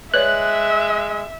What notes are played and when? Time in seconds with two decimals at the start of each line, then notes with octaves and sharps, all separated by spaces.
0.14 G#3 B4 C#5 D5 E5 F#6